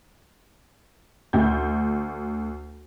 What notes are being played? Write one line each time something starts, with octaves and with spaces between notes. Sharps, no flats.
D2 G6